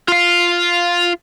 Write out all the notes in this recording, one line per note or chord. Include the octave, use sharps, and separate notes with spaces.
F4 F5